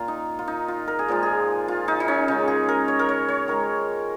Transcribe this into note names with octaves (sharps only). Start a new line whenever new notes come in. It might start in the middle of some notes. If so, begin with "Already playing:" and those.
Already playing: A#2 A#3 F4
D#4
F4
D#4
F4
A#4
G#4
A#2 F3 G#3 F4
G#4
F4
D#4
D#4
C#4
C#3 G#3 D#4
G#4
A#4
C#5
A#4
C#5
C#5
D#3 G#3 A#4